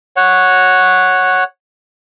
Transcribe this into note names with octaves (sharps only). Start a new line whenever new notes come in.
C#5 F#5